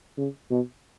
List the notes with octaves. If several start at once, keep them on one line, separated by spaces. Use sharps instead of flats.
C#3
B2